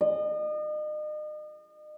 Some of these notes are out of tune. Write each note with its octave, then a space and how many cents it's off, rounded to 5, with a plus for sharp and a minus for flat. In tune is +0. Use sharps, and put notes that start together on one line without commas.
D#5 -40